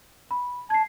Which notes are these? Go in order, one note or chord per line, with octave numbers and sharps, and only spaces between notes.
B5
A5 G#6 C7